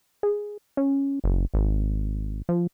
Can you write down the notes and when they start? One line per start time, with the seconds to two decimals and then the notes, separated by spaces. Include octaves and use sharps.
0.23 G#4
0.77 C#4
1.24 F#1
1.54 G#1
2.49 F3